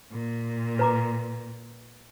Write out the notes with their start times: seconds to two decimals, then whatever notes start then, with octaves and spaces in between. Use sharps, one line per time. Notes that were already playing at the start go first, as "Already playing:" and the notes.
0.11 A#2
0.79 B4 A#5 D6